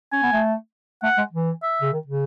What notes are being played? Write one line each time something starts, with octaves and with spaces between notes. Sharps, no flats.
C#4 G#5
B3
A3
A3 F#5
G#3
E3
E5
C#3
D#3
C#3